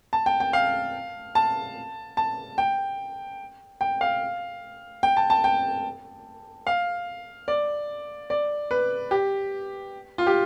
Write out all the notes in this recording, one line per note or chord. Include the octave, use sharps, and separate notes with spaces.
A5
G5
G5
F5
A5
A5
G5
G5
F5
G5
A5
A5
G5
F5
D5
D5
B4
G4
F4
G4